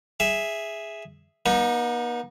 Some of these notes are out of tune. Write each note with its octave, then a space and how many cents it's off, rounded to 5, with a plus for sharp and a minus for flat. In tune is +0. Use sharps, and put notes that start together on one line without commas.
G#4 +0 E5 +0
B3 -45 D#4 +0